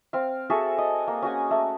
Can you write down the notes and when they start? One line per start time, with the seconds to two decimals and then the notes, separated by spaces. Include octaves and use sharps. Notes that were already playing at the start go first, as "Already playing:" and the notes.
0.13 C4 F5
0.50 F#4 G#4 A4 E5
0.78 D#5
1.08 A#3
1.22 C#4 F#4 F#5 G#5
1.51 A3